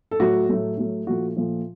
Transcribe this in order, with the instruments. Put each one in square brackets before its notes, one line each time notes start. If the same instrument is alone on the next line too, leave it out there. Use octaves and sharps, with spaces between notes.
[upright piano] A4
A2 F#3 A3 F#4
A2 F#3 A3
A2 F#3 A3
A#2 F3 A3 F#4
A#2 F3 A3